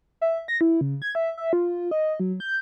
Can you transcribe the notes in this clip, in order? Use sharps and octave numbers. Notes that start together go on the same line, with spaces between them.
E5
A#6
E4
C#3
G#6
E5
E5
F4
D#5
F#3
G6